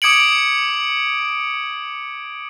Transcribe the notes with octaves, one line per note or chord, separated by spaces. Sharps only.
D6 D#6 G#6 C#7 D7 F#7